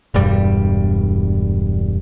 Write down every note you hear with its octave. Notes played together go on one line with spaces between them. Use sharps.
E1 G2 G3